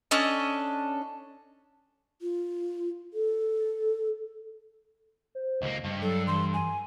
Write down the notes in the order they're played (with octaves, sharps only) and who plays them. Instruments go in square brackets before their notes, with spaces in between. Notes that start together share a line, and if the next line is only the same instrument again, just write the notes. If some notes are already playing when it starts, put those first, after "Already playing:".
[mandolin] C#4 D4 A4 D#5
[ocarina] F4
A4
[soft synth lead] C5
[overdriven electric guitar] C#2 A#3 [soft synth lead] D#5
[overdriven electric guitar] G2
[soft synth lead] F#3 [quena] A4
[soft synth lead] E3 [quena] C6
[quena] G#5